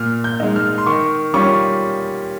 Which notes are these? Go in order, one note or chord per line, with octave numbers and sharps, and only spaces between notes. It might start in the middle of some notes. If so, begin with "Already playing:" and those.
Already playing: A#2 F6
G6
G#3 D#4
F6
C6
D#3 C#6
G3 C#4 F4 C#6